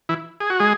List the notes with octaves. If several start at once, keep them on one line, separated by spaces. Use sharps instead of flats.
E3 E4
G#4
F#4
G#3 G#4